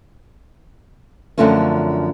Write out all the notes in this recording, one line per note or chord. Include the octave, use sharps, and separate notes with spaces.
F#2 D3 F3 A3 C4 C#4